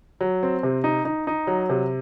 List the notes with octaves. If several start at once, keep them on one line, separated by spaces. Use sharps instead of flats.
F#3
C4
C3
D#4
D#4
D#4
F#3
C3